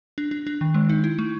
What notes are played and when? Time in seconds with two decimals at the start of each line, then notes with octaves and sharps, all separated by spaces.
0.18 D4
0.31 D4
0.47 D4
0.61 D#3
0.74 G#3
0.89 D#4
1.04 E4
1.19 A3